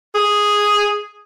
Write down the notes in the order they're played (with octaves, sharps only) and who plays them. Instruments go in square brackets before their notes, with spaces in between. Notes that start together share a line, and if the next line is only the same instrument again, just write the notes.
[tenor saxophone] G#4